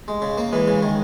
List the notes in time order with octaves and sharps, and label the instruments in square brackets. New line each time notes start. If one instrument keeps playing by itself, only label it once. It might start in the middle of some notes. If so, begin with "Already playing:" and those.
[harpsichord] G#3
C#3
A#3
[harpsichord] E3 [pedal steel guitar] G#3
[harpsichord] C#3
D#3